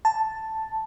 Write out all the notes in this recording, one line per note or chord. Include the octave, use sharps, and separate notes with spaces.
A5